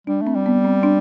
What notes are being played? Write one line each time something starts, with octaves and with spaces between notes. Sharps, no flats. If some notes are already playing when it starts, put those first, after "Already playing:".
G3 D4
A3
C4
G3
B3
C4
D4